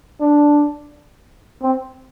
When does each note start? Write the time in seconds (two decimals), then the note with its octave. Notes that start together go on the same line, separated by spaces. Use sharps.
0.20 D4
1.62 C4